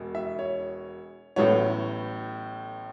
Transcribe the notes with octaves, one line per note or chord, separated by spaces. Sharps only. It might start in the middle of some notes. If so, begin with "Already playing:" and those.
Already playing: E1 B2
E5
C#5
A1 A2 F#3 B3 C#5